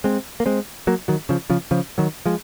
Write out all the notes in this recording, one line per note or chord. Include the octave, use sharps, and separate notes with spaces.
G#3 C4
A#3
G#3 C4
F#3 A#3
D#3 F#3
C#3 F3
C#3 F3
C#3 F3
D#3 F#3
F3 G#3